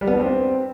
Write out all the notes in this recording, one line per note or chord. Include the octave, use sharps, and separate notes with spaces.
G3
B3
D4
C4